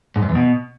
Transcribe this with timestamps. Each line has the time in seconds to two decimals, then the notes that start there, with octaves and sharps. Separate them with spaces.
0.16 G#2
0.22 F#2
0.29 E2
0.35 B2